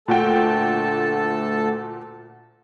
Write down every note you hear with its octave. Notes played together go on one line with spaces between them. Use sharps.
D2 A#2 F#4 A4 G5 A5